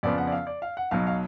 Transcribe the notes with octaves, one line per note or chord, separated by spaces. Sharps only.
F2 C#3 F3 B3 D5
F#5
D5
F5
D5
F5
F#5
B1 B2 F#3 F5
F5